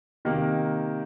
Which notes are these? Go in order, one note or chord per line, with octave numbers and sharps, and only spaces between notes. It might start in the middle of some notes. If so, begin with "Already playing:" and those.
C3 D#3 A#3